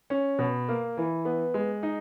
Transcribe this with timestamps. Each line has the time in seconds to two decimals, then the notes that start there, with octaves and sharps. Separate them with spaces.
0.10 C#4
0.39 B2
0.69 A#3
0.97 E3
1.25 B3
1.54 G#3
1.83 D#4